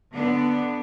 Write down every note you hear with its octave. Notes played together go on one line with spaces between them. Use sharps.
D3 B3 D4